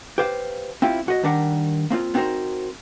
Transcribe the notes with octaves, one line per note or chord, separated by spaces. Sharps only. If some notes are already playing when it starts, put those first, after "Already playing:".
G4 B4 C5 F5
C4 E4 F4 G4
B1 F#4 D#5
D#3 G3 D4 A#4 F#5
A#3 C4 D#4 F4
B3 C4 D#4 F#4 A#4 C5